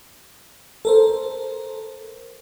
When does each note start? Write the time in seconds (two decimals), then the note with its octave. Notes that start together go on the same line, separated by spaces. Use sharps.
0.85 A4 A#4 C5